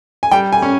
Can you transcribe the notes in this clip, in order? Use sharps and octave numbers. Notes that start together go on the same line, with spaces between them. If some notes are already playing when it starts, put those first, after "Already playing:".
G#5
G3 G5
G#5
C#4